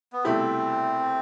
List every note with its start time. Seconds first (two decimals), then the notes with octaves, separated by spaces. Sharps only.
0.13 B3
0.24 C2 B2 A3 C4 E4 G4